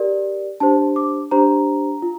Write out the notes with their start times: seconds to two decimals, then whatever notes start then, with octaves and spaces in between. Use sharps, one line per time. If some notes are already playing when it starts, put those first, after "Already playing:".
Already playing: G4 A#4 D5
0.60 D4 G4 C5 A5
0.96 D6
1.31 D4 G4 C5 A#5
2.02 F4